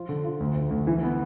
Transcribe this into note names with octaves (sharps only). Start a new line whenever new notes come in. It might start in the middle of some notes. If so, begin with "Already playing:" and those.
Already playing: F3 F4
D3
F4
D2
D2
D2
E3
B3